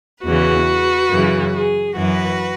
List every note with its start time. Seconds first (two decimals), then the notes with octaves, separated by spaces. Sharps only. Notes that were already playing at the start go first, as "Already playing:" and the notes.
0.23 E2 C#3 E3 F#4 B4
1.10 F#2 C#3 E3
1.54 G#4
1.96 F#2 E3 F#4 B4